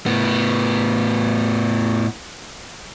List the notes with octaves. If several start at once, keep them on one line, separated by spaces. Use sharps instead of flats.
A2 B3